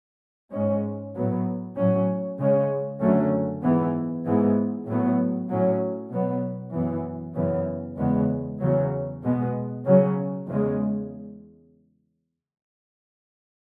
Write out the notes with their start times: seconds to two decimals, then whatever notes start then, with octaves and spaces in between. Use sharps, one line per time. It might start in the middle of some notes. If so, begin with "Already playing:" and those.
0.52 G#2 G#3 C#4
1.14 A2 F#3 B3
1.76 A2 F#3 C#4
2.39 C#3 G#3 C#4
3.00 F#2 D3 F#3 A3 C#4
3.63 G#2 E3 B3
4.25 G#2 E3 G#3 B3
4.87 A2 F#3 B3
5.49 A2 F#3 C#4
6.12 B2 F#3 B3
6.74 F#2 E3 B3
7.35 F#2 C#3 E3 B3
7.98 E2 C#3 G#3 B3
8.60 E2 C#3 F#3
9.22 B2 G#3 B3
9.85 C#3 F#3 C#4
10.47 E2 C#3 G#3